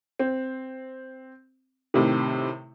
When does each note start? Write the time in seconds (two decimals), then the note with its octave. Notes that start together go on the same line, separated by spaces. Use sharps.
0.19 C4
1.94 A2 C3 D#3